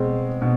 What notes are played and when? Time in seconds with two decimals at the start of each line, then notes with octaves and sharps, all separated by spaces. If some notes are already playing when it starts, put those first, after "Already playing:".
Already playing: B2 G#3 C4
0.42 B2